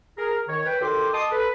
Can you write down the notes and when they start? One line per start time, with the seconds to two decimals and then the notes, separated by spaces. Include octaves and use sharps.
0.18 G#4 A#4
0.48 D#3 C#5
0.66 B4 G5
0.81 D#2 F#4 A4 G5 C6 D6
1.14 D#5 A5 C6 D6 D#6
1.31 A4 B4